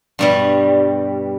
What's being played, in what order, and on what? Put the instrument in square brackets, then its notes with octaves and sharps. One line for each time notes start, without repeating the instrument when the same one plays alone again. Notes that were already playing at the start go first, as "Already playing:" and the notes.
[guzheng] G2 B2 G3